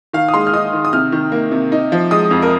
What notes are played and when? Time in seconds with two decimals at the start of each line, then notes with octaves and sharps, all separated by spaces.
0.13 D#3 F5
0.28 D#6
0.34 G#3 C6
0.47 F6
0.53 D#4 D#6
0.73 D#3
0.85 D#6
0.93 C3 F6
1.12 D#3
1.32 A#3
1.52 C3
1.72 D#4
1.92 F3
2.11 G#3 D#6
2.31 F2
2.42 A#4